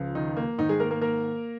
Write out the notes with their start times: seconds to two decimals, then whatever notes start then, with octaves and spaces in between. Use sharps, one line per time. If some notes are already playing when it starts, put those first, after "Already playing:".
Already playing: C#2 C#3 F3
0.15 D#3 D#4
0.37 A#3
0.58 G#2 D#3 D#4
0.69 G#3 G#4
0.80 A#3 A#4
0.90 A#3 A#4
1.01 A#3 A#4